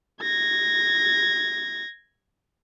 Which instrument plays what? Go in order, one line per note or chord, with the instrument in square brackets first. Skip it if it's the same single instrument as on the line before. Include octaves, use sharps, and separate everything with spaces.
[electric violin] G#6 A#6